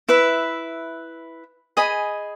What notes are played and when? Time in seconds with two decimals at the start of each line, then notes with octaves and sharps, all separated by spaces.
0.08 E4 B4 E5
1.77 G#4 D#5 G#5 B5